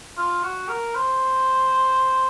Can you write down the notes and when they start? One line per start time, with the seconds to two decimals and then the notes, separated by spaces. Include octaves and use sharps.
0.17 F4
0.43 F#4
0.69 A#4
0.95 C5